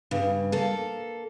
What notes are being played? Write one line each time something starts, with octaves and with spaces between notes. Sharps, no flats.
G2 C#3
A#3 A4